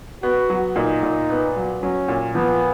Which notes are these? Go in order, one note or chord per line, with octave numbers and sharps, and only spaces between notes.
B3 F#4
F#3
A#2 D#4
A#2
B3
F#3
F#3 C#4
A#2
F3 B3